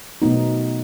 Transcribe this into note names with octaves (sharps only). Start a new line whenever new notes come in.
B2 F#3 A3 B3 D#4